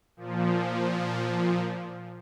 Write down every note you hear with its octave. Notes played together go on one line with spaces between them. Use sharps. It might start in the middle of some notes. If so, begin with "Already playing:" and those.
A#2 F3